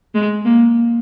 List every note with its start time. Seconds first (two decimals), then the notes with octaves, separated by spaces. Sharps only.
0.15 G#3
0.45 A#3